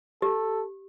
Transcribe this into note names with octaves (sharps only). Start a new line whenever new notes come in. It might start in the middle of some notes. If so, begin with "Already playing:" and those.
G4 A4